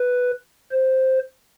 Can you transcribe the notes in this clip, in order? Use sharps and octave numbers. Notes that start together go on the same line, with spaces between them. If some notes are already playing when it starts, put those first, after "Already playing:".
Already playing: B4
C5